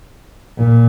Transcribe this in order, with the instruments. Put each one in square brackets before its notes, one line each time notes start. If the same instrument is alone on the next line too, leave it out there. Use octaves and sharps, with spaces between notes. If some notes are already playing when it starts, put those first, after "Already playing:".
[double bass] A#2